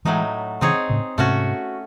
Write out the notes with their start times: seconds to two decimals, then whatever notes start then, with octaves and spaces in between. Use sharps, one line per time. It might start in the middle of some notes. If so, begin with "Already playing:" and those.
0.05 A2 E3 F#3 G#3 A3 D#4
0.61 C#3 E3 C4 D#4 G#4 C#5
0.90 A2 C#3
1.18 G#2 C3 A3 C#4 F#4